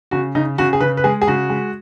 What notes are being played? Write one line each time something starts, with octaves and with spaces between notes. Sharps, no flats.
C#3 F#4
C#3 D#4
C#3 F#4
G#4
C#3 B4
B4
G#3 G#4
G#4
C#3 F#4
G#3